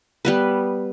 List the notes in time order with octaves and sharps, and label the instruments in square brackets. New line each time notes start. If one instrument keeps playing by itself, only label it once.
[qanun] G3 B3 B4